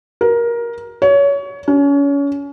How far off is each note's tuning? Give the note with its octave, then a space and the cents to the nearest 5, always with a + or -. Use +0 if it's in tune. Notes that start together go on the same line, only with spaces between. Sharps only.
A#4 +15
C#5 +25
C#4 +30